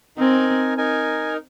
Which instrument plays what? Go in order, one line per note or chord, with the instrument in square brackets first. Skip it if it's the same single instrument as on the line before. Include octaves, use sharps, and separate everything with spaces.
[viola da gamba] C4 [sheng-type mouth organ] D#4 A#4 G#5
[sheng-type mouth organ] D#4 A#4 G#5